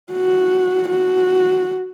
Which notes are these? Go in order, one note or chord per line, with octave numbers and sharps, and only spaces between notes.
F#4
F#4